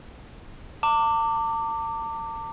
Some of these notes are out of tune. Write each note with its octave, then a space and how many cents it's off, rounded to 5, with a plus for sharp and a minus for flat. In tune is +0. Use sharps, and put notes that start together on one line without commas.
A5 +45 D6 +0